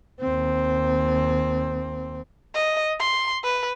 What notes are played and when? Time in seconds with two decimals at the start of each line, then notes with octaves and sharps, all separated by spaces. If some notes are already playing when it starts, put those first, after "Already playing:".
0.21 D#2 C4
2.54 D#5
3.00 C6
3.44 B4